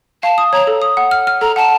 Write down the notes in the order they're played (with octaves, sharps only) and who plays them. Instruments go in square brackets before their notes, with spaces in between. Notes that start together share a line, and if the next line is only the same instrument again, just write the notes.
[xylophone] F5 [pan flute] A5
[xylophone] D#6
[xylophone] C#5 [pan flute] A#5
[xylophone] A4
D#6
F#5
F6
F6
[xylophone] A4 [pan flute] A#5
[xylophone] F#5 [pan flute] A5